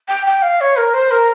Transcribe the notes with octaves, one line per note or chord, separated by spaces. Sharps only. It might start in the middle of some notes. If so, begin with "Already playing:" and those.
G5
G5
F5
C#5
A#4
C5
A#4